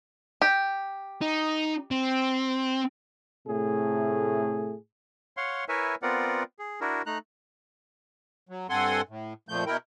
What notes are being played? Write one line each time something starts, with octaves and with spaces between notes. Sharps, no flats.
G4
D#4
C4
A2 C3 A3 G#4
C#5 F5 F#5 C6
E4 A#4 B4 C#5 E5 G#5
B3 C4 F4 A#4 D5 F#5
G#4
D4 E4 F#4 A#4
A3 D#4 A#5 F#6
F#3
G2 C4 A4 F#5 G#5 C6
A2
F2 A#2 F3 A3 G6
B2 E4 A#4 G5